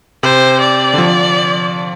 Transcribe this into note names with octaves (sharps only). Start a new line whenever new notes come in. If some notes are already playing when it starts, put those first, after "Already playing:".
C3 C5
D5
D3
F3